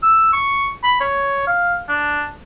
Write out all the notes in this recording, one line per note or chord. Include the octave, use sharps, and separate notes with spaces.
E6
C#6
B5
C#5
F5
D4